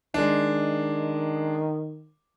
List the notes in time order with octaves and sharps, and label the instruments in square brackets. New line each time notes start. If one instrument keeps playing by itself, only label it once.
[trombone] D#3 [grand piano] G#3 D4